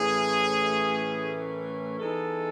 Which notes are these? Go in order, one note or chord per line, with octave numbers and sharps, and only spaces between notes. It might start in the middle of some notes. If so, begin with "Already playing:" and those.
Already playing: A2 E3 A3 C#4 G#4
A#4
E3 G#3 B3 D#4 A4